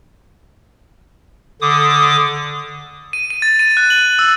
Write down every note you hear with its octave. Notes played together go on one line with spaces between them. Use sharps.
D3 D6 D#6
D#7
D#7
A6
D#7
F#6
F#7
E6